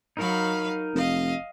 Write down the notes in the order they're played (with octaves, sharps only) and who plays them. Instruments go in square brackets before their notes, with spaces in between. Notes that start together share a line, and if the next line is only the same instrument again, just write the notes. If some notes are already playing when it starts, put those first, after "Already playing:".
[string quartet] F#3 F5 B5 [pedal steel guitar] D#4 A#4
[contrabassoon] F1 [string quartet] D#5 F5